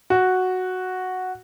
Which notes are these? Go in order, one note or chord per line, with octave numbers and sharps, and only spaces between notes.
F#4